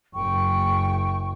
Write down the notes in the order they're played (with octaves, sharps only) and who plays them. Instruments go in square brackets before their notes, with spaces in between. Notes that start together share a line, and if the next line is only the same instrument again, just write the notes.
[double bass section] F#1 [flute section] G5 C#6